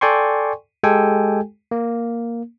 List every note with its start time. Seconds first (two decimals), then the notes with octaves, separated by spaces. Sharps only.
0.01 A4 D5 G5 G#5 C6 C#6
0.83 G#3 G4 A4 G5 G#5
1.71 A#3